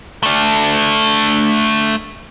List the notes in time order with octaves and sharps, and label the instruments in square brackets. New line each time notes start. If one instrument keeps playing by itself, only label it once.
[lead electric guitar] A3 D4